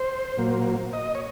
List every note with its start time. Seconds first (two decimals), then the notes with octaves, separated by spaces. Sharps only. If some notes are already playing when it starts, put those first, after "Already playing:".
Already playing: C5
0.38 A#2 F#3 A#3
0.93 D#5
1.15 C#5